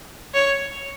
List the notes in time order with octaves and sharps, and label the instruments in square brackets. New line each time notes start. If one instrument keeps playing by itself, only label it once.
[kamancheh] C#5